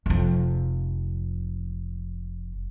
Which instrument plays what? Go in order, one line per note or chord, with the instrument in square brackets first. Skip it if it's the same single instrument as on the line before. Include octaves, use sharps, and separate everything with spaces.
[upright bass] F1 F2